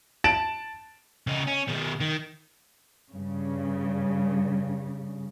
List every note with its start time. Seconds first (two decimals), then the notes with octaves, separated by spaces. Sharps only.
0.24 A5 A6 D7 E7 F#7
1.27 C#3 D#4
1.47 C#4
1.68 B2 D#3
2.00 D#3
3.14 G2 C#3